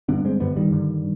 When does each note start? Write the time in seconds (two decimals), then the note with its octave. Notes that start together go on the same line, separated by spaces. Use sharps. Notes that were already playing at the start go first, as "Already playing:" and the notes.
0.09 G2 D3 B3 D4
0.25 G#3 C4
0.40 G2 D3 G3 B3
0.57 D#3 G3
0.72 G2 D3